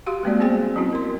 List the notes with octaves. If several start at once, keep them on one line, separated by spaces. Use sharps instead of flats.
F#4 G4 F5 C6
G3 G#3 A#3 C4 F#4 D5
B3 C4 G#4 C5 G5 G#5
F#3 C4 C#4 E4 F#4
A#4 C6